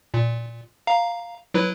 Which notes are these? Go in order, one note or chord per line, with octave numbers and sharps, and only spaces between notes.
A#2
F5 A#5
F#3 E4 B4